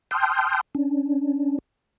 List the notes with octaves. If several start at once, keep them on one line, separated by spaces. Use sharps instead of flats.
G5 A5 C6 D#6 F6 G6
C#4 D4